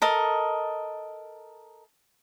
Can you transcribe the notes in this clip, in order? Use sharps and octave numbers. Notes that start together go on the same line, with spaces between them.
A4 A#4 D#5